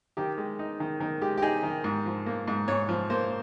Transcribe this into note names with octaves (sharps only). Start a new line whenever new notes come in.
D#3 G4
G#3
D#4
D#3
D#3
G#3 G4
G4
D#4 G#4
D#3
G#2
F3
A#3
G#2
G#2 C#5
F3
A#3 C5